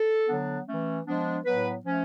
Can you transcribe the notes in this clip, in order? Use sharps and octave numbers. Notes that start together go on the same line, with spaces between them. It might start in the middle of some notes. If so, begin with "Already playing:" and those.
Already playing: A4
D3 F#3 B3 D4
E3 A3 C#4
F3 G#3 B3 D4
A2 F#3 B3 B4
F3 A3 C#4